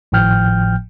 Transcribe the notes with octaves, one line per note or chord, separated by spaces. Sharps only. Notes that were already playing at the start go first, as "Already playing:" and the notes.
G#1 A2 F3 G5 F6 G6